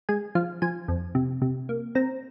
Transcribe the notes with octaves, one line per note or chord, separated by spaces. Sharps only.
G#3 G#5
F3 F5
F3 G#5
F2
C3
C3
A#3
C4 A#5